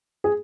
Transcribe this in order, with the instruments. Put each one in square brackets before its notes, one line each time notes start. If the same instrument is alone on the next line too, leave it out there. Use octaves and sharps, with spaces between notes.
[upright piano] G#4